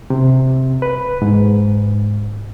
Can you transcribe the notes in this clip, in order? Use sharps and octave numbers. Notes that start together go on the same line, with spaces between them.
C3
B4
G#2